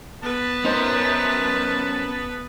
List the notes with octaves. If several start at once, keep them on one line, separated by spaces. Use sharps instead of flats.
B3 B4 A5
C#4 D#4 A#4 C5